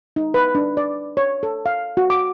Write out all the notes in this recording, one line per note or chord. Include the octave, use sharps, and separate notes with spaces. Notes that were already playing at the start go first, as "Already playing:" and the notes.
D#4
B4
D4
D5
C#5
A4
F5
F#4
D6